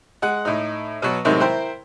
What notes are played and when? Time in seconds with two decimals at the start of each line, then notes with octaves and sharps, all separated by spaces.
0.22 G#3 F#5
0.45 A2 D#4
1.02 B2 F#3
1.25 A2 C3 D#3 F#3 G#3
1.40 E4 A#4 C5 G5 C6